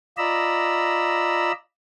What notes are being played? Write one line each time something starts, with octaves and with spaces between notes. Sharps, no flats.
F4 D5 D#5 A#5 B5 E6